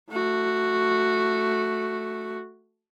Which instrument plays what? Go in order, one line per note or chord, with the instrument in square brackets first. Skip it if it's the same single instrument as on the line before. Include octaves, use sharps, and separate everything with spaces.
[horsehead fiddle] A3 F#4